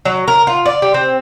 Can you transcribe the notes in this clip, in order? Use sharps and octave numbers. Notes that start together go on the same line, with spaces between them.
F#3
A#4
F4
D5
G4
C4